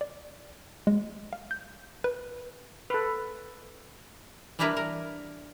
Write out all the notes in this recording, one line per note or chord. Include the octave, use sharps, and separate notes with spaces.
D5
G#3
F5
G6
B4
A4 B4
E3 G3 D4 E4 A#4 B4
A#4